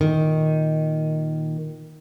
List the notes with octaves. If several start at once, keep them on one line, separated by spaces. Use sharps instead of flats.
A#2 D#3